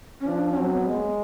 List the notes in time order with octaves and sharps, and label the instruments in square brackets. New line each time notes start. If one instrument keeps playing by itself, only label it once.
[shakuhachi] C#4
[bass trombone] F3 [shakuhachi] D4
[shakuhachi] C#4
[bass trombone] F#3 [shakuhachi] C4
[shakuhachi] B3
[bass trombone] G#3 [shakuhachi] B3
[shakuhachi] A#3